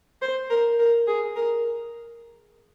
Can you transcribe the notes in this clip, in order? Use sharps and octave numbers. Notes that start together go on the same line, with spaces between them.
C5
A#4
A#4
G#4
A#4